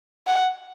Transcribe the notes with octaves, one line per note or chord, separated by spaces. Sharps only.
F#5